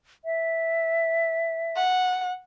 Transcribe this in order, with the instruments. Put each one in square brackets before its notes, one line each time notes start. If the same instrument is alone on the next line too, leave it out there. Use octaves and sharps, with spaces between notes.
[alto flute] E5
[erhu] F#5